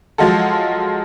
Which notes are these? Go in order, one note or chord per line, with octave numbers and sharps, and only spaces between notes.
F3 F#3 G#3 F4 F#4 A4